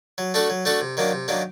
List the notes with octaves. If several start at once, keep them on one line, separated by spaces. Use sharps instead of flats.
F#3
A3 D4 F#4 A4
F#3
A3 D4 F#4 A4
C3
D#3 F#3 A#3 D4
C3
D#3 F#3 A#3 D4